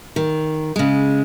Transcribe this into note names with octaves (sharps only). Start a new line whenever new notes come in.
D#3
C#3 G#3